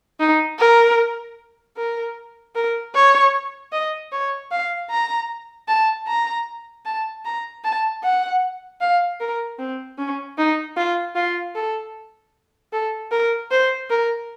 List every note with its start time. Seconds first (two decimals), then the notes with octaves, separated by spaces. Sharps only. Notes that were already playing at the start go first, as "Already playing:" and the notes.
0.20 D#4
0.59 A#4
1.77 A#4
2.55 A#4
2.95 C#5
3.72 D#5
4.12 C#5
4.51 F5
4.90 A#5
5.68 A5
6.08 A#5
6.85 A5
7.25 A#5
7.64 A5
8.03 F#5
8.81 F5
9.20 A#4
9.59 C4
9.98 C#4
10.38 D#4
10.77 F4
11.15 F4
11.55 A4
12.73 A4
13.12 A#4
13.51 C5
13.90 A#4